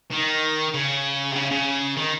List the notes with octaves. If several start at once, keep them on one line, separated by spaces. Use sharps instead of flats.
D#3
C#3
C3
C#3
C#3
D#3